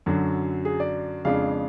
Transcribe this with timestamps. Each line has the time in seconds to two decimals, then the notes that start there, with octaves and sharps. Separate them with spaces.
0.06 F#2 D3 F#3
0.65 G#4
0.80 D5
1.25 F2 C#3 G#3 D4 F5